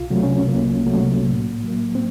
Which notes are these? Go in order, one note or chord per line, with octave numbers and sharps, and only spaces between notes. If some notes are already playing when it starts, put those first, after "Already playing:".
Already playing: C2 F4
C3 F#3 A3
C#4
C2 A#3
C3 F#3 A3
A2
F#3 A#3
C4